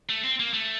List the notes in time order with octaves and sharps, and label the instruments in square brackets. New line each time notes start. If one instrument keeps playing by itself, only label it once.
[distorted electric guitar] A3
C4
A#3
A3